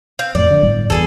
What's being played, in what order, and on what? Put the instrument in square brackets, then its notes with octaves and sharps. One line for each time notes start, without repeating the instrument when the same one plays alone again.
[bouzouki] C4 F5
[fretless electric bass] F2 A2 [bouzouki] D5
[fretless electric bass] D3
G1 A2 G3
[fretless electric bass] E2 [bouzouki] E4 G#4 A4